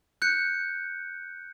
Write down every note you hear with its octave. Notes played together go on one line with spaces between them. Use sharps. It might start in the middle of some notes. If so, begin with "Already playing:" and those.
F#6 G6 C#7